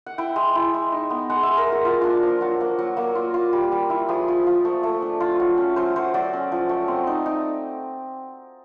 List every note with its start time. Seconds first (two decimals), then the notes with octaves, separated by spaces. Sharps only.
0.06 F#5
0.18 E4 G5
0.36 G#3
0.55 E4
0.74 G#3
0.92 D#4
1.10 B3
1.30 G#3 F#5
1.43 E5
1.49 G#3
1.57 A#4
1.66 G#3
1.72 F#4
1.85 A#3 F4
2.01 D4 F4
2.23 F3
2.41 F#3 F#4
2.60 A#3
2.79 F#3
2.97 A#3
3.15 F4
3.34 F4
3.53 G3
3.72 G3
3.90 E4
4.09 F3 G#4
4.28 F3
4.47 F3
4.65 A3
4.83 A3
5.02 D4
5.20 F4
5.40 F#3
5.57 C#4
5.76 F#3 C5
5.96 F#3 C5
6.14 F#3 D5
6.33 C#4
6.52 F3
6.69 A3
6.88 C4
7.07 D#4
7.26 D#4